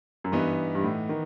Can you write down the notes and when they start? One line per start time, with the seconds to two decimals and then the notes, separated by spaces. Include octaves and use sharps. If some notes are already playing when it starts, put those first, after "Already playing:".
0.24 F#2
0.32 G2 E3 B3 D#4
0.75 G2
0.84 A2
1.09 D#3